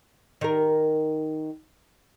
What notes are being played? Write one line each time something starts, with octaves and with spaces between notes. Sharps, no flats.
D#3 A#4